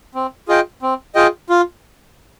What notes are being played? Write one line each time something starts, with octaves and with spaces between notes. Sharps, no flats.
C4
F4 G#4 D#5 G5
C4
F4 G#4 D#5 G5
F4